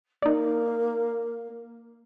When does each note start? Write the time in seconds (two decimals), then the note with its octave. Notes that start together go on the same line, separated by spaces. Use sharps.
0.22 A#3 D#4 D5